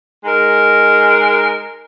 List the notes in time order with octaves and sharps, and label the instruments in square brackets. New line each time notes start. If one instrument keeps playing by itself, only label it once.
[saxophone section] G#3 D#4 A#4